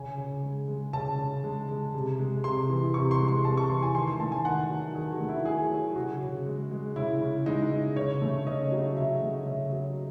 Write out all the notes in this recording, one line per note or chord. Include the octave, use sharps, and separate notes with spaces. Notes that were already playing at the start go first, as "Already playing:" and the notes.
Already playing: C#3 G#5
C#3
G#3
G#3
C#3 A5
C#3
G#3
G#3
C3
G#3
C3 C6
E3
C3 C#6
C6
G#3
C6
C3 A5
C#6
E3 C6
G#5
D#3 C6
C6
A3 A5
G#5
D#3 F#5
F#3
D#3 G#4
F#4
A3
E4
D#3 G#4
F#3
C#3 F#4
C#3
G#3
G#3
C#3 E4
C#3
G#3 D#4
G#3
C#3 C#5
A3
C#3 D#5
F#3
C#3 E5
A3
C#3 E5
F#3